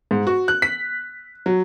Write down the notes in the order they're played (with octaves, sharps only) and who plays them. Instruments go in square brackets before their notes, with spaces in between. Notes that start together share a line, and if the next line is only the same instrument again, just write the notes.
[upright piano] G#2
F#4
F#6
B6
F#3